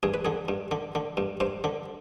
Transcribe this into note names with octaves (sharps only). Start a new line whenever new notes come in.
G2 G#4
B4
D3 G#4
G2
D3
D3
G2
G2 C5
D3